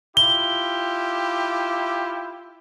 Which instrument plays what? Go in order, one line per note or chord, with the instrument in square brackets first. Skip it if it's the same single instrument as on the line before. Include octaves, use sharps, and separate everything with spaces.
[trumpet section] E4 F4 G4 [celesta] G7